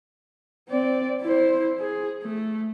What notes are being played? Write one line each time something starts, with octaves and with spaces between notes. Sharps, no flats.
C4 D5
E4 C5
G#4
A3